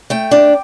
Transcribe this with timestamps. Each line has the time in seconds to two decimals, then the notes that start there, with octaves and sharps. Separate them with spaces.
0.10 A3 G5
0.31 D4